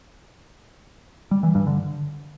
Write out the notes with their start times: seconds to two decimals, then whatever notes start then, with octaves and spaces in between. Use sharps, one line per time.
1.31 G3
1.43 E3
1.55 G2
1.67 D3